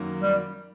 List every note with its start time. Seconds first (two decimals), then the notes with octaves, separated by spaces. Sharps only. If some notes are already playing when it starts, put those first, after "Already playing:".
Already playing: F#2 D#3 F#3 A#3
0.22 G3